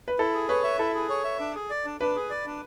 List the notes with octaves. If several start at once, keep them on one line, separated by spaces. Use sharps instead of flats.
B4
E4 A4
G#4
B4 C#5
E5
E4 A4
G#4
C#5
E5
D4
G#4
D5
D4
D4 B4
G#4
D5
D4